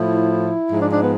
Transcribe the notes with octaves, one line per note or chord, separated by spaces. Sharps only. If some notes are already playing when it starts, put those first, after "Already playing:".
Already playing: A2 F3 E4
G#2 F3
D4
D4
B3